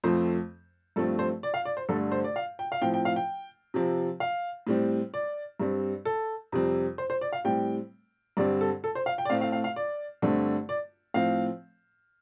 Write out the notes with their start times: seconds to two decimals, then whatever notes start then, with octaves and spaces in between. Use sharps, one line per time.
0.04 F2 F3 A3 C4 C5
0.96 G2 F3 A3 C4 A4
1.19 C5
1.43 D5
1.54 F5
1.65 D5
1.77 C5
1.89 G2 D3 A3 A4
2.12 C5
2.24 D5
2.36 F5
2.59 G5
2.72 F5
2.82 A2 F3 C4 G5
2.94 G5
3.05 F5
3.16 G5
3.74 C3 F3 C4
4.20 F5
4.67 A2 G3 C4
5.14 D5
5.60 G2 G3 C4
6.05 A4
6.52 F2 C3 G3 C4
6.98 C5
7.10 C5
7.21 D5
7.33 F5
7.45 A2 G3 C4 G5
8.37 G2 D3 G3 C4 D5
8.61 A4
8.84 A4
8.95 C5
9.06 F5
9.18 G5
9.25 D5
9.30 A2 A3 C4 F5
9.41 F5
9.52 F5
9.64 F5
9.76 D5
10.22 G2 D3 A3 C4
10.69 D5
11.14 A2 F3 C4 F5